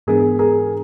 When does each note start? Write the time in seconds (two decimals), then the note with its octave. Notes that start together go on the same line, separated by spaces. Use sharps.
0.07 G#2 E3 G#3 B3 D4 G#4 A#4
0.39 G#4 A#4